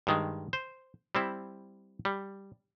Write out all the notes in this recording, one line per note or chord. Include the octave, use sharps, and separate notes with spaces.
G2 D#3 G#3
C5
G3 C4 E4
G3